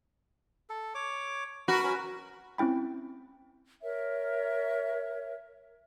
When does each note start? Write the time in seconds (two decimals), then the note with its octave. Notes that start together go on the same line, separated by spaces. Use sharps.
0.70 A4
0.95 C#5 D6
1.68 F#4 A#4 B4
1.84 C#4 A#4 B4
2.58 C4 C#4 E4 G5 B5
3.82 A#4 C#5 E5